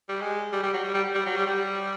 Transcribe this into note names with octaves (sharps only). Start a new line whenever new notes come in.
G3
G#3
G3
G3
F#3
G3
G3
G3
F#3
G3
G3